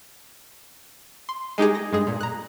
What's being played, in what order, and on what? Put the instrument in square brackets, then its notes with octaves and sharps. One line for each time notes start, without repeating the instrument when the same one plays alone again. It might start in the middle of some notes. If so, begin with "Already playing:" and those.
[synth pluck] C6
G#3 D#4 G4 G#4
A#6
G2 G#3 G#4
A#2
A#5 F#6